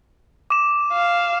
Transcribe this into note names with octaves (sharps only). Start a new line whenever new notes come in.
D6 E7
F5